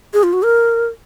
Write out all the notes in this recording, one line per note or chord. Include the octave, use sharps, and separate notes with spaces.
G#4
F4
F#4
A#4